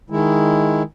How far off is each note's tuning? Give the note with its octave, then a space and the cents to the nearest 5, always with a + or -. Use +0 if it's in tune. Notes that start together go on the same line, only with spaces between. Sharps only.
D#3 +0 G#3 +0 E4 +0